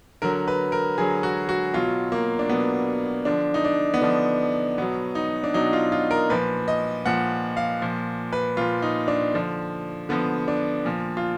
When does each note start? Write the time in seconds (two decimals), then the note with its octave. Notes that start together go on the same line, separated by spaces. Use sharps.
0.22 D3 F#3 A#4
0.48 B4
0.72 A#4
0.98 D3 F#3 G#4
1.23 F#4
1.49 F#4
1.74 B2 F#3 F4
2.12 A#3
2.39 D4
2.49 B2 F#3 B3
3.25 D3 F3 D4
3.54 D#4
3.64 D4
3.94 B3
4.02 D3 F3 D4
4.78 B2 F#3 B3
5.15 D#4
5.44 D4
5.54 B2 F#3 D#4
5.73 F4
5.92 F4
6.11 A#4
6.30 A#2 F3 B4
6.68 D#5
7.06 A#2 F3 F#5
7.57 F5
7.82 A#2 F3
8.33 B4
8.57 A#2 F3 F4
8.82 D#4
9.08 D4
9.34 D3 F3
10.09 D3 F3 B3
10.48 D4
10.85 A#2 F3
11.17 F4